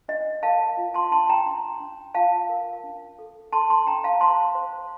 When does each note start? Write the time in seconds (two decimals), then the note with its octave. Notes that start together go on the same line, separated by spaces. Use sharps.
0.08 D4 D#5
0.43 A#4 F5 A5
0.77 F4
0.94 A5 C6
1.11 D4 A5 C6
1.29 G5 A#5
1.46 D4
1.80 D4
2.14 F4 F5 A5
2.49 A#4
2.84 D4
3.19 A4
3.53 A4 A5 C6
3.70 A5 C6
3.87 D4 G5 A#5
4.04 F5 A5
4.21 C5 A5 C6
4.55 C5